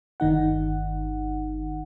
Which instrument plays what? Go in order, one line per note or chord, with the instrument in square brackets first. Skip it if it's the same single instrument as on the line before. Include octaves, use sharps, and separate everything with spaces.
[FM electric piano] G1 D#3 D#4 F#5